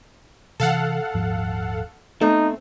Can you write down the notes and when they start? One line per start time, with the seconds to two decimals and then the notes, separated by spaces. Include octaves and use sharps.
0.60 C3 E3 A4 F5 F#5
1.14 D#1 G#2 F3
2.21 A3 B3 C4 D#4